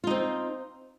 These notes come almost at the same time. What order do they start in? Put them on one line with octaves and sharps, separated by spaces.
F4 D#4 C4